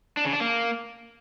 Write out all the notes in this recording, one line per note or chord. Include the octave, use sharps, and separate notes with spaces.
D4
C#3
D4
A#3